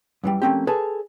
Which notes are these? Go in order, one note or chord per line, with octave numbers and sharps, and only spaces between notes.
F#2 E3 G3
F3 A3 A#3 C4 C#4 G4
G#4 A4 B4 C#5 G#5 A5